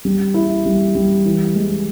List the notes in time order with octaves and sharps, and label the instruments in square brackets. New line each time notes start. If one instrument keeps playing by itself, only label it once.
[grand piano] G3
E4
G3
G3
E3
G#3